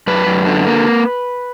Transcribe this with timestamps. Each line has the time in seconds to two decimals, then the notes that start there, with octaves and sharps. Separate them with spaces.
0.07 F#2 B4
0.26 F#2
0.46 D3
0.67 A#3